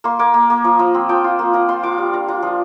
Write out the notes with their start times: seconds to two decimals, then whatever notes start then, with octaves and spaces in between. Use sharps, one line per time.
0.04 A#3 C6
0.19 A#3 D6
0.34 A#3
0.50 A#3
0.64 F3
0.79 F3
0.94 C4
1.09 F3 G5
1.24 F4
1.39 A#3
1.53 F4 A#5
1.69 F4 C6
1.83 F4 D6
1.98 G3
2.13 D4 A#5
2.28 F4 A#5
2.43 F3